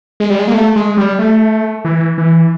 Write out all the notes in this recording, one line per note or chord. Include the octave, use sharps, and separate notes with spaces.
G#3
G3
G#3
A#3
A3
G#3
G3
A3
E3
E3